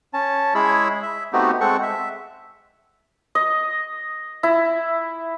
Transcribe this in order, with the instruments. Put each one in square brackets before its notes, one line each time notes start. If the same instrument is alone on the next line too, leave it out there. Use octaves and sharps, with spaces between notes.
[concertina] C#4 A5
G#3 E4 G#4 C#5 B5 E6
E5
A3 B3 C4 D#4 F#4 G4
G#3 C4 A4 F#5 C#6
E5
[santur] D#5
E4